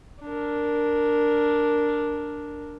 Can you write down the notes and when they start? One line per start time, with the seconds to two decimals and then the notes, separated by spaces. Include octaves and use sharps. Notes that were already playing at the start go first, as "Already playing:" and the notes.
0.23 D4 A#4